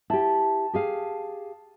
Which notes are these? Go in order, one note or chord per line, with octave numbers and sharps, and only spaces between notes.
E4 G4 A5
G4 G#4 F5